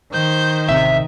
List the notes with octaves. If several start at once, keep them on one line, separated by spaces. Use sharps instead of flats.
D#3 C5 G6
A1 C3 E5